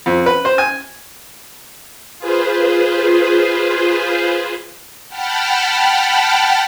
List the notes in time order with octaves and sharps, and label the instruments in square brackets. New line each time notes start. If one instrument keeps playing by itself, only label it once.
[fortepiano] F2
B4
C5
G#5
[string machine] F4 G#4 B4 C5
F#5 G5 A5 B5 F6